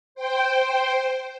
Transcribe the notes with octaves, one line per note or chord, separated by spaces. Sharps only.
C5 G5